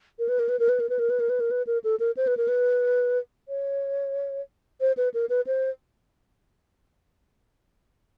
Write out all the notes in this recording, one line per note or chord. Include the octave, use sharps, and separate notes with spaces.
A#4
B4
A#4
B4
A#4
B4
A#4
B4
A#4
B4
A#4
B4
A#4
B4
A#4
A4
A#4
C5
B4
A#4
B4
C#5
C5
B4
A#4
B4
C5